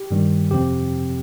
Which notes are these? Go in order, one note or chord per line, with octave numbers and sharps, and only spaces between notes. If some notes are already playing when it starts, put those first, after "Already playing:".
Already playing: G4
G2 D#3 G3
F2 C3 F3 C4 G4